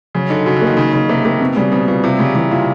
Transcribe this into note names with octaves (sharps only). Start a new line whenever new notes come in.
C#3 F#3
D3 D#4
C#3 F#4
D3
A#3
D#3
C#3 D#4
C#3 D#4
C3 A#3
C3 A#3
B2 C4
C#3 G3
B2 C4
B2 F4
C3 F4
C#3 G3
C3 E3
A#2 F4